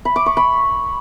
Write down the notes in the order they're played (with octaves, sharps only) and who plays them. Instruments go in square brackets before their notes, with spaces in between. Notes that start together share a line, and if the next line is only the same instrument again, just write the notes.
[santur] B5
D6
C#6
B5